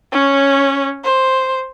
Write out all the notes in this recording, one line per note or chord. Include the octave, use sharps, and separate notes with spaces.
C#4 C#5
C5